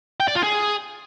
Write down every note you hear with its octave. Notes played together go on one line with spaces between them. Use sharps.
G5
D5
F4
G#4